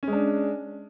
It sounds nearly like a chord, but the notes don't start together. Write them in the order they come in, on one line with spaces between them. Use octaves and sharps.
C#4 G#3 D4